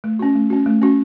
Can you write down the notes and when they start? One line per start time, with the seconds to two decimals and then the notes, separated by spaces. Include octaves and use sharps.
0.04 A3
0.19 C#4 F#4
0.35 A3
0.50 C#4 F#4
0.66 A3
0.82 C#4 F#4